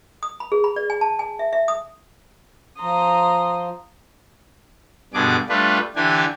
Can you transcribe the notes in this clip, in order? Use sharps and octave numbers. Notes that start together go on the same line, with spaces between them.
D#6
B5
G#4
B5
D5
G#5
A5
G#5
E5
E5
D#6
F3 A#5 C6 D#6
G2 B2 D3 G#4 D6
G3 A3 D4 F4 B4
D3 E3 D4 G4 G#5